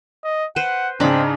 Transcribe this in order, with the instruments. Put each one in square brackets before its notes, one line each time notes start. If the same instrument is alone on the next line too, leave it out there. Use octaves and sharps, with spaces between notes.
[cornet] D#5
[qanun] B4 C5 [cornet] F#5
[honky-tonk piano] G#2 C#3 [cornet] C4 [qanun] D4 B5